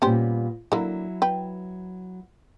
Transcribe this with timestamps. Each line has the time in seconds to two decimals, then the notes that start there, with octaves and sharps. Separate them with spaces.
0.02 A#2 G3 B3 C#4 G4 C5
0.72 D3 F#3 A#3 E4
1.22 B4 G5